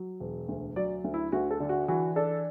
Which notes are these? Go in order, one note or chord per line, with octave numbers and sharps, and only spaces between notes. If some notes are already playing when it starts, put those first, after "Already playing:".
Already playing: F#3
E1
D2
F#3 D5
D2
E4
D2 F#4
A4
D3
F#4
E3 F#4
D4 A4